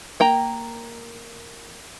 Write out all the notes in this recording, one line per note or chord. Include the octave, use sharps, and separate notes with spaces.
A#3 G5 A#5